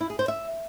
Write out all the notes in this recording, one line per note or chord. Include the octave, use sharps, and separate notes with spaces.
E4
G#4
C5
E5